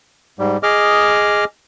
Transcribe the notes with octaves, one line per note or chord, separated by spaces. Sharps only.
G#2 G3
G#4 D#5 D6 F6